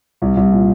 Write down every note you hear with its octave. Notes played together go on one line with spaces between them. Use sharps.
C2
C2
A#2